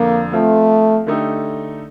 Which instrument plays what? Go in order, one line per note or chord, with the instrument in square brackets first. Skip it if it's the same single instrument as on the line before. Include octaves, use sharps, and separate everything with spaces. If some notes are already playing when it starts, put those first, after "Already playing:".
Already playing: [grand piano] F2 D3 F3 [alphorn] A#3
[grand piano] F3 C4 F4 [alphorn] A3
[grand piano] D3 A3 D#4 G4